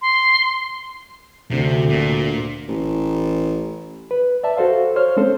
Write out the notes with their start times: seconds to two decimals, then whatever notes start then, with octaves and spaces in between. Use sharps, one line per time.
0.02 C6
1.51 D2 C3
1.90 A#2
2.68 A1
4.11 B4
4.43 D5 E5 A5
4.57 F#4 A4 C5 F5
4.96 C5 C#5 F6
5.17 G#3 C4 C#4 A4 C5